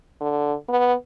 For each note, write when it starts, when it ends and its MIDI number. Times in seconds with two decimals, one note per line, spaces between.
0.21 0.54 50
0.69 0.94 59